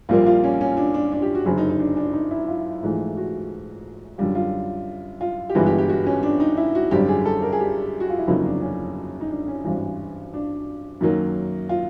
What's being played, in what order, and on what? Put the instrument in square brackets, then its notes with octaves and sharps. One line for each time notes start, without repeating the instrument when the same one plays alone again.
[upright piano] A#1 A#2 G3 A#3 F4
F4
C#4
C#4
D4
D4
D4
G4
F#4
F#1 F#2 D3 G#4
D#4
D#4
D4
D4
D#4
E4
F4
A#1 G#2 E3 A3
F#4
F#2 D3 G3 F4
F4
F4
G4
G1 G2 E3 G#3 B3 F#4
G4
G4
F#4
C#4
D4
D#4
E4
F#4
G#1 F#2 D3 G3 G4
G#4
A4
A#4
G#4
G4
F#4
F4
E4
G1 F2 C#3 F#3 A#3 D#4
D4
C#4
D#4
D4
C#4
G#1 G2 E3
D4
F#2 D#3 F#3 A#3 D#4
F4